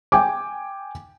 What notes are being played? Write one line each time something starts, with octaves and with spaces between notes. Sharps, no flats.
G5 G#5 D6